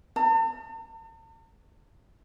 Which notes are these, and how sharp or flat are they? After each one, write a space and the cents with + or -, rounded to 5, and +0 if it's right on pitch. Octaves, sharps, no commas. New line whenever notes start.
A5 +45